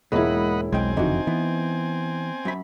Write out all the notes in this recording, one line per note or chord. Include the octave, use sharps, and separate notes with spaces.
E1 G#2 A#3 E4 D#5 F#5 B5
B1 G#3 C4 G5 G#5
F#1 F2 D3 E3 D#4 F#4
E3 B3
F#2 B5